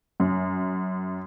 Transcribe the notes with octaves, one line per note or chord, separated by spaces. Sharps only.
F#2